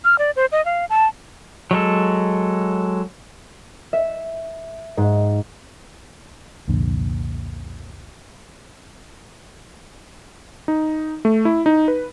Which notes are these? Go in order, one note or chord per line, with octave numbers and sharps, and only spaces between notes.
F6
D5
C5
D#5
F5
A5
F#3 G#3 A4
E5
G#2
C2 F2 A#2 D3
D#4
A3
E4
D#4
B4